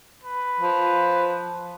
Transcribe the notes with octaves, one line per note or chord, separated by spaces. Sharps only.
B4
F3